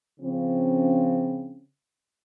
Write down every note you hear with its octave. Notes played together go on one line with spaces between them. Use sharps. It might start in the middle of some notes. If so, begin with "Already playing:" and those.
C#3 F3 C4 C#4